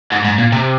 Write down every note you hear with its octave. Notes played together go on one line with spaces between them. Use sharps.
G#2
G#2
A#2
C3